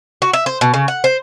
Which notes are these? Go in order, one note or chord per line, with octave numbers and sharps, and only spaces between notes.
F#4
E5
C5
B2
C#3
F#5
C5